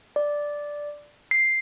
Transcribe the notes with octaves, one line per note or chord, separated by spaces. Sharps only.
D5
C7